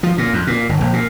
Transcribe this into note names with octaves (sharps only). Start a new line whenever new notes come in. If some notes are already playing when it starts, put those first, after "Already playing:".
F3
A#2
F2
A#2
G1
A#1
A#2